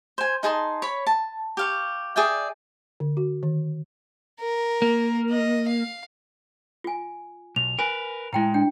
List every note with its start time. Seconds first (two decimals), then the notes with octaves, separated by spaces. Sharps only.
0.18 C5 G#5
0.43 D#4 G#4 A5 C6
0.82 C#5 B5
1.07 A5
1.57 G4 F5 C#6
2.16 G#4 D5 E5 G5
3.00 D3
3.17 F#4
3.43 D#3
4.40 A#4
4.82 A#3
5.30 D#5
5.68 F5
6.84 F4 G#5
7.56 B1 F7
7.79 A#4 B4 G#5
8.33 A2 G#3 E4 G5 A#5
8.54 D4 G5